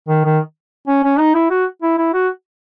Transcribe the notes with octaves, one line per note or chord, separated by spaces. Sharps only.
D#3
D#3
C#4
C#4
D#4
E4
F#4
E4
E4
F#4